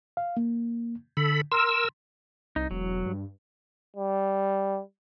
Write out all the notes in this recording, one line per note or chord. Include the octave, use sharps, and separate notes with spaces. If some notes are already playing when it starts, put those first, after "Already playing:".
F5
A#3
D3 A4 B5
A#4 C6 E6
C2 D#4
E1 F#3
G2
G3